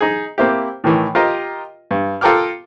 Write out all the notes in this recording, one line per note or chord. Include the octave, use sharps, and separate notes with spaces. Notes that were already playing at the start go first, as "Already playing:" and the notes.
D#4 G#4
A#3 C4 E4 G4
A2 D#3 E3
F4 G4 A#4 D#5
G2
F4 A4 A#4 G5 D6 F6